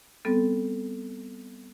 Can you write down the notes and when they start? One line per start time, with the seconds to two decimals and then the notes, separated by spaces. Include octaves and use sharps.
0.25 G3 B3 C4 A4